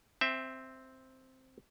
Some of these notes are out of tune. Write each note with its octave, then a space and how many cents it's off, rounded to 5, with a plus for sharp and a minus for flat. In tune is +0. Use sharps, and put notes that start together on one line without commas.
C4 +0 E5 +0 G5 +35